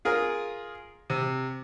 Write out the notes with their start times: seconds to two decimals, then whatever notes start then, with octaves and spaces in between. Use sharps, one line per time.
0.05 F4 G#4 A#4
1.10 C3